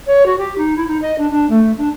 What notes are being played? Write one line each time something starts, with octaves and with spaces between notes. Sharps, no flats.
C#5
F#4
G4
D#4
E4
D#4
D#5
D4
D4
A3
D4